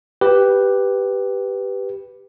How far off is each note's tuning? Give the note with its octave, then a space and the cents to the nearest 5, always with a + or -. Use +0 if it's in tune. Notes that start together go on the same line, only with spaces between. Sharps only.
G4 +0 B4 +0